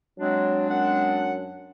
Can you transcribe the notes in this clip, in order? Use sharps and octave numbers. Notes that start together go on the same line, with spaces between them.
F#3 G#3 C4 D4
F#2 F#5